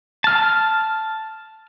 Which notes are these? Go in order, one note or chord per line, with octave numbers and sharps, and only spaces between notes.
A5 F6